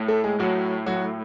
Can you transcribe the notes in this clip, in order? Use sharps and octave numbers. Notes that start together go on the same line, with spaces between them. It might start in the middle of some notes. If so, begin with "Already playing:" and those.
Already playing: A2
A3 A4
G#3 G#4
A2 F#3 F#4
F#3 F#4